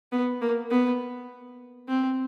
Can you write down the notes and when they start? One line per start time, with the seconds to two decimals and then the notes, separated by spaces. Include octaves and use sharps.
0.12 B3
0.41 A#3
0.71 B3
1.88 C4